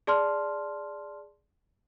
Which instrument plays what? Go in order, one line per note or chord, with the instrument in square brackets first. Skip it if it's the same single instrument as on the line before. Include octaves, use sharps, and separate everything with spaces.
[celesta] G#4 D5 A5 C6 F6